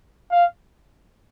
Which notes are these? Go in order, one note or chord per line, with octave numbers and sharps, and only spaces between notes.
F5